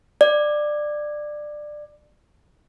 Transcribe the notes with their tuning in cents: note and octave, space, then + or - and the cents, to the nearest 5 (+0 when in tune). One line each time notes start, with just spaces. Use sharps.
D5 +20